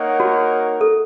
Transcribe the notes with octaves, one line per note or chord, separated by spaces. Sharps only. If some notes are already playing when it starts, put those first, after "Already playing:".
Already playing: A#3 D#4 A#4 C#5 F#5
F#4
A4